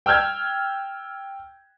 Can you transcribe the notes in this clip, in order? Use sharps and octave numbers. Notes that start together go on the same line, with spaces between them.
G5 E6 F6 G6 G#6